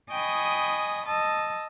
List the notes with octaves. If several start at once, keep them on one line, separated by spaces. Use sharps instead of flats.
D#5 G5 G#5 B5 C#6 D#6
D#5 A5 E6